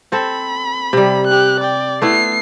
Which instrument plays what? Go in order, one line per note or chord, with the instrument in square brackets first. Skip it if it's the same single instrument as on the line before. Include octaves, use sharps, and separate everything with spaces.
[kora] C4 A4 [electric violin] B5
[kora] C3 G3
[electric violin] G4 F#6
D5 G5
[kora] A3 B3 E4 [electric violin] C7